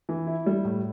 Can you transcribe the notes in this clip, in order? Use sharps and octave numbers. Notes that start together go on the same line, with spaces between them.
E3
E4
G3
A2